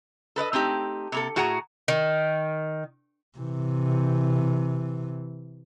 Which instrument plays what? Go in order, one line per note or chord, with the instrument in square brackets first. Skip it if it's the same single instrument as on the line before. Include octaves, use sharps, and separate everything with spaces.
[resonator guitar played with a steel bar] A4 B4 D5 D#5
A3 C4 D#4 G4
C3 A#3 A4
A2 F#4 G#4 F#5 A#5
[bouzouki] D#3
[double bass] C3 E3